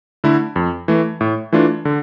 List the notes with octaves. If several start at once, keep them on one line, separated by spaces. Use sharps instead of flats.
D3 A3 E4
F2
E3 A3
A2
E3 A3 D4 F4
D3